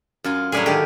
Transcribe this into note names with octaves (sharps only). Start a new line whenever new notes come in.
F#2 F4 G#5
A2 F#3 G3 D4 E4 G#4
D3 D#3 G#3 G4